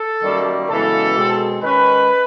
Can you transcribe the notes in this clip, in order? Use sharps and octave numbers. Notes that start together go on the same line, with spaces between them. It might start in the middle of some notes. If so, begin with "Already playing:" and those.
Already playing: A4
F#2 D#3 G3 A#3
F#2 C#3 E3 G#3 B3 A4
B2 G#3 C4
D#3 G#3 C#4 B4